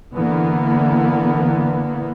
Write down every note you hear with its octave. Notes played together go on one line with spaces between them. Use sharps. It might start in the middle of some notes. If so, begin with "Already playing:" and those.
D3 E3 A#3 B3